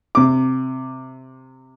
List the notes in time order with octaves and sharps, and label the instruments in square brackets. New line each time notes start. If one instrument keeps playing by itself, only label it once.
[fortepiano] C3 D6